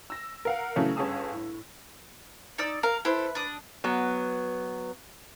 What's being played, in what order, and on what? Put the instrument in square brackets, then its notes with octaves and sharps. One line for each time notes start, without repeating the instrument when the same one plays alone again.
[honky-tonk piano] E6 A#6
A#4 F5 F#5
C#3 E3 F#3 A3 C#4
G1 C#4 G#4 A5 D#6 E6
A2
[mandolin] D#4 D5 E6
[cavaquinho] A#4 [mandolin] F5
[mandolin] E4 A4 C5 [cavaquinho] B4
[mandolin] D4 D#6
[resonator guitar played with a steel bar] F#3 B3